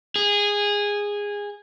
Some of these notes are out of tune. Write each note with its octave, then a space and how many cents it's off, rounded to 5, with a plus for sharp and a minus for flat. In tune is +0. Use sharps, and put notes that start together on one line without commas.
G#4 -15